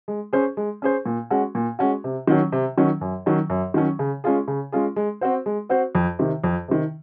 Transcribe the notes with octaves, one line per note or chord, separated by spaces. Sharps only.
G#3
C#4 G#4 C5
G#3
C#4 G#4 C5
A#2
G#3 C#4 F#4
A#2
G#3 C#4 F#4
C3
D#3 F#3 C#4
C3
D#3 F#3 C#4
F#2
D#3 F#3 C#4
F#2
D#3 F#3 C#4
C#3
G#3 C#4 F4 G#4
C#3
G#3 C#4 F4 G#4
G#3
C4 F#4 C5
G#3
C4 F#4 C5
F2
C3 D#3
F2
C3 D#3